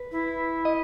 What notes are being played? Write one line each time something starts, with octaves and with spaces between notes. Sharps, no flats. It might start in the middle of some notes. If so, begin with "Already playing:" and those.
Already playing: B4
E4
D#5